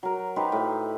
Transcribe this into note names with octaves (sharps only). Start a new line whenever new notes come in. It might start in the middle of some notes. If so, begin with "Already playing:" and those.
F#3 A#4
D#4 G4 B4 C5
A2